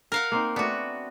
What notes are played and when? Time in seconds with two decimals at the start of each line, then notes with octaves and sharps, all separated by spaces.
0.12 A#4 F5 F#5
0.32 A#3 C4 D#4
0.56 A3 B3 D4 F#4